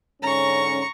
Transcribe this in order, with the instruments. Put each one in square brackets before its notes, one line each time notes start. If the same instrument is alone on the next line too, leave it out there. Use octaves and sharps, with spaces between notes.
[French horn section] G#2 D3 C#4 [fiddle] A#5 C#6